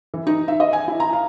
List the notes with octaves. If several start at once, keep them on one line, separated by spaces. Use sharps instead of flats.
E3
D#4
E5
D#5
G#5
E4
A#5
F5